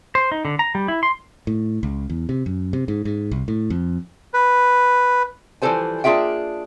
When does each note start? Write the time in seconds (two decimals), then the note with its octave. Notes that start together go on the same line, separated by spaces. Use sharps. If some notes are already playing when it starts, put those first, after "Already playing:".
0.15 C5
0.32 D#4
0.45 D3
0.59 A#5
0.75 G3
0.88 E4
1.03 C6
1.47 A2
1.83 C#2
2.10 E2
2.29 C3
2.46 F#2
2.73 C3
2.88 G#2
3.05 G#2
3.32 C2
3.48 A2
3.70 F2
4.34 B4
5.62 E3 F3 G3 A4 C5 G#5
6.04 A#3 D4 F4 G#4 E5 G5